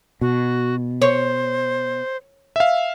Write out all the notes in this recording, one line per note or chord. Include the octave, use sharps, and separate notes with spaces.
B2 F#4
C5 C#5
E5 F5